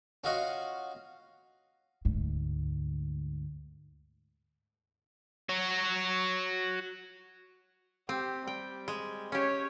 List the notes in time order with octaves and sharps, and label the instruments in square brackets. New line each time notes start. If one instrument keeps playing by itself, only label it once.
[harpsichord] C#4 F4 F#4 D#5 F5 F#5
[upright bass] D2 G#2
[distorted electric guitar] F#4 C#5
[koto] C4 [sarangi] G4
[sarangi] G3 [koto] G5
[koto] G#3
[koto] C#4 G4 [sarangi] C#5